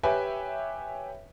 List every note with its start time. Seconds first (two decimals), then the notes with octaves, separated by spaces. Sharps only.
0.03 G4 B4 C#5 E5 G5 G#5